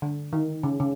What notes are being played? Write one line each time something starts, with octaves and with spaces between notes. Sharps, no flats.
D3
D#3
C#3
C#3